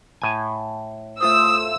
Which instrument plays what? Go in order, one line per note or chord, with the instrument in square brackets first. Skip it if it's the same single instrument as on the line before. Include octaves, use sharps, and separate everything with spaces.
[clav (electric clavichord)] A2 G#5
[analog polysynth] A3 F4 C5 [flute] D#6 [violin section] E6